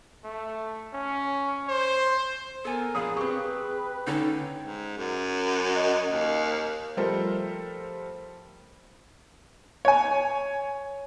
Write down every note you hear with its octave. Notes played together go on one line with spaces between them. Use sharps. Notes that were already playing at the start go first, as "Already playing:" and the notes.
A3
C#4
C5
B3 A4 A#4 G#5
A#1 G#4 C#5 F5 D#6
C4 G4 B4 C#6
D3 C#4 D#4 A4 G5
G#2
F#2
D#5
D#2
F3 G3 A3 A4 A#4 C5
C#5 G#5